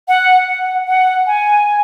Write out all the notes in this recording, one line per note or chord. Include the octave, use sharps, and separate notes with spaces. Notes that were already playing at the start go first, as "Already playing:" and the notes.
F#5
F#5
F#5
G#5